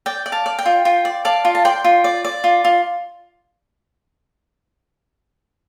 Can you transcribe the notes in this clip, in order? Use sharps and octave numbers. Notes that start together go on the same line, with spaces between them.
D5 G5
D5
F5 A5
D5
G5
F4
F4 G5
D5
D5 F5 A5
F4
A5
D5 G5 C6
F4
D5
D5
F4
F4